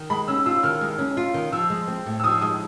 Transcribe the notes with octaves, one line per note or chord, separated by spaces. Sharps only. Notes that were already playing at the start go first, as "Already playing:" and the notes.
Already playing: D#3
G#3 B5
C#4 E6
F4 E6
D#3 F6
G#3
C#4
F4
D#3
F3 E6
G#3
C4
A2
E6
F3 D#6
G#3 D#6